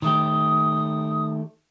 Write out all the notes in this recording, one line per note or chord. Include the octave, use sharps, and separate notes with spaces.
D#3 A3 G4 D#6